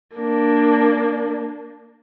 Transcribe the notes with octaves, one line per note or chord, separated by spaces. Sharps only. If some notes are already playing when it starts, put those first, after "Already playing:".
A#3 D4